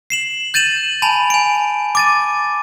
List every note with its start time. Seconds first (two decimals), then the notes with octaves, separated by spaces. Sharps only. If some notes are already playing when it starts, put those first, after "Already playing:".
0.10 C7 E7 F#7
0.54 G6 A6 D#7 E7 F#7
1.02 G#5 A5 B5
1.30 G#5 D7
1.95 D6 A6 D#7